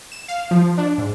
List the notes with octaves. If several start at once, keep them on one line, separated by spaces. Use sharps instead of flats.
E7
F5
F3
D4
G#2